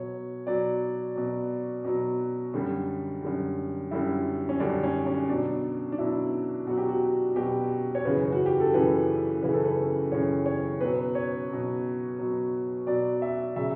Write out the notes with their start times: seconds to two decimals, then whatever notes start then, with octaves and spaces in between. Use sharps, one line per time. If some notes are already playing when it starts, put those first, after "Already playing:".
Already playing: B2 F#3 C#5
0.47 B2 F#3 D5
1.16 B2 F#3
1.84 B2 F#3
2.54 F#2 D3 G3
3.22 F#2 D3 G3
3.91 F#2 D3 G3 E4
4.49 C#4
4.60 F#2 D3 G3 D4
4.83 C#4
5.07 C#4
5.29 B2 F#3 D4
5.92 D4
5.98 B2 F#3 E4
6.67 B2 F#3 F#4
6.78 G4
6.88 F#4
7.36 B2 F#3 G4
7.95 C#5
8.05 F#2 C#3 E3 B4
8.32 F#4
8.46 G4
8.60 A4
8.74 F#2 C#3 E3 B4
9.42 F#2 C#3 E3 B4
9.53 A4
9.64 B4
10.12 F#2 C#3 E3 C#5
10.46 C#5
10.81 B2 F#3 B4
11.15 C#5
11.49 B2 F#3
12.19 B2 F#3
12.87 B2 F#3 D5
13.22 E5
13.56 C#3 F#3 E5